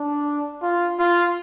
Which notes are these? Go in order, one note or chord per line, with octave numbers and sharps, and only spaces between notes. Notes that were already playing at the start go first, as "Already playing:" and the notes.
Already playing: D4
F4
F4